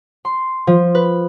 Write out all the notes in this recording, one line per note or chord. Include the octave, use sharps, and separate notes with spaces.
C6
F3
B4